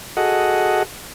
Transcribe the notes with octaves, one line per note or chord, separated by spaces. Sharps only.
F#4 G#4 A4 D#5 F#5